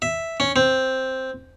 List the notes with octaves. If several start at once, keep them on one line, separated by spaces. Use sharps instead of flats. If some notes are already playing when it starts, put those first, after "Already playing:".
E5
C#4
C4